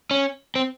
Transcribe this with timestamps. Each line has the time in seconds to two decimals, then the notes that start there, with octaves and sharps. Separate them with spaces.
0.11 C#4
0.55 C4